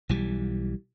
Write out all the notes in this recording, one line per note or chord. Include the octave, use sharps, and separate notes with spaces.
B1 E3 G3